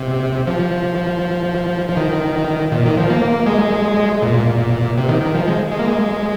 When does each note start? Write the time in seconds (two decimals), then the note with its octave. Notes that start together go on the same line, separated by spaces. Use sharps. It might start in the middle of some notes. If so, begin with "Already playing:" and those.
Already playing: C3
0.47 F3
1.89 F3
1.97 D#3
2.72 A#2
2.85 D#3
2.97 F3
3.10 A#3
3.46 G#3
4.22 A#2
4.97 C3
5.09 D#3
5.22 D#3
5.34 F3
5.47 G#3
5.71 G#3
5.79 A#3
5.87 G#3